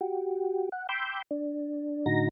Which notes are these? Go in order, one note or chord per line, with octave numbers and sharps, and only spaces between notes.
F#4 G4
F#5
G5 B5 C6 D6 E6 G6
D4
A2 D3 D#4 F#4 A#5 A#6